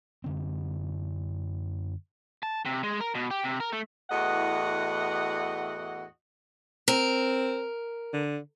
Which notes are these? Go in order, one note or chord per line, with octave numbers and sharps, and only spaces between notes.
F#2 D3 C4
A5
C3
G#3
A#4
B2
G4
C3
A#4
A3
E2 A2 E3 F#4 D#5 F#5
C4 A#4
D3